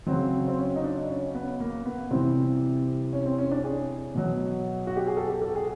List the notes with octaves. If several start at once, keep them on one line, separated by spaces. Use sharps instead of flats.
C#3 F#3 C4
C4
C#4
D#4
D4
C#4
B3
A#3
B3
C3 E3 G3 C4
C#4
C4
C#4
D4
G#4
B2 F#3
F#4
G4
G#4
A4
G4
A4
G#4